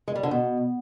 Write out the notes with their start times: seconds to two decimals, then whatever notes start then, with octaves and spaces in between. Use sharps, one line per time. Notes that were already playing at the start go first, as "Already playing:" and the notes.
0.08 G#3
0.15 G3
0.23 D3
0.31 B2